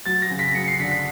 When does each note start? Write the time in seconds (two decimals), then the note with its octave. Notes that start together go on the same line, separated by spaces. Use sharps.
0.06 F#3 A6
0.22 A#6
0.31 C#3
0.39 B6
0.54 F#3 C#7
0.68 C7
0.80 D3 B6
0.91 B6